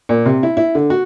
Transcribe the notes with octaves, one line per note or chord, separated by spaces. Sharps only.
A#2
C3
E4
E4
D3
F#4